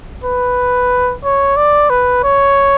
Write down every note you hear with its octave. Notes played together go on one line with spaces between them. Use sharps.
B4
C#5
D5
B4
C#5